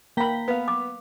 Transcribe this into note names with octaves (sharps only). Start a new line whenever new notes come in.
A#3 G5 A#5 B5 B6
B3 B4 F5
D6